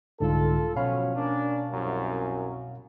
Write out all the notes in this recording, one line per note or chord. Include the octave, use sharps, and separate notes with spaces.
C2 G#2 D3 F4 A4
B2 F3 F#3 C#4 F5 B5
A#3 C#4 D4
C2 F#2